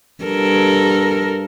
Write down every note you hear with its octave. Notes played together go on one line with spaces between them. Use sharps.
G2 A4 A#4